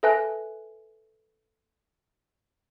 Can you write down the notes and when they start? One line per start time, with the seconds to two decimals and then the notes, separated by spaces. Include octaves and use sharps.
0.03 A4 B4 E5 G#5 A5 F#6